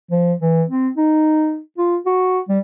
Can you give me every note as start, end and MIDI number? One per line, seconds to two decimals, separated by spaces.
0.11 0.34 53
0.42 0.64 52
0.69 0.89 60
0.97 1.59 63
1.78 1.97 65
2.06 2.40 66
2.49 2.59 55